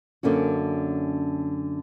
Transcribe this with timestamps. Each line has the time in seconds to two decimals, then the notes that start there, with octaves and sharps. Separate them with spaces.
0.23 F#2 D3 A#3 C#4 F#4